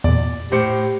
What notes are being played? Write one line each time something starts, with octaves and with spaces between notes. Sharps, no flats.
E2 A#2 D5
A2 G4 C5 C#7